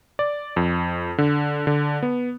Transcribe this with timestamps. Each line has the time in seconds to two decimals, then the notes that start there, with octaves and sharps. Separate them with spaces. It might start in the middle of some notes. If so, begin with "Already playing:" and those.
0.19 D5
0.56 F2
1.18 D3
1.67 D3
2.03 B3